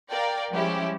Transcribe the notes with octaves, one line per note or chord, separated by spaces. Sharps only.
A#4 D5 F5 G5
F3 G3 G#3 C#4 E4 G4